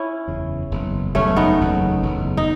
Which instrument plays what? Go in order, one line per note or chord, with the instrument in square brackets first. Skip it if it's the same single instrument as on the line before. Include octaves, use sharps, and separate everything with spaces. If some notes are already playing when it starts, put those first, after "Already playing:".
Already playing: [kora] C#4 E4
[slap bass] F#1 E2 C#3
F#1 E2 B2
[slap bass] F#1 E2 B2 [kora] A3 C#4
[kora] B3 D#4
[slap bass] F#1 E2 B2
F#1 E2 B2
[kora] D#4